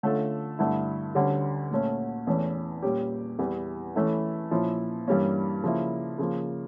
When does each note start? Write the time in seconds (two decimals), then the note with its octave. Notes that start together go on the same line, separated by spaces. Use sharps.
0.03 D3 A3 C#4 F4 A4
0.59 G2 D3 A3 E4
1.15 D2 D3 G3 C#4
1.71 A#2 A3 C#4
2.27 E2 E3 A3 C#4
2.82 A#2 G3 C#4 G4
3.38 E2 E3 G3
3.96 E3 A3 C#4 E4 A4
4.51 A#2 F3 C#4 E4
5.07 G2 E3 G3 A#3 C#4
5.64 C#3 F3 A#3 E4
6.18 C#3 F3 A#3